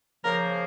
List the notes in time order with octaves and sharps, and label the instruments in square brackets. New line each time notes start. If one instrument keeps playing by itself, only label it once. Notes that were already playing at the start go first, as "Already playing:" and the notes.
[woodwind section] C#3 F3 A#3 [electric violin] A#4